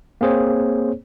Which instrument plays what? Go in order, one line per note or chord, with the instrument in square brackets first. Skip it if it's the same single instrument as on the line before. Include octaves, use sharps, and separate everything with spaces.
[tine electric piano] A#3 C4 G#4 C5 C#5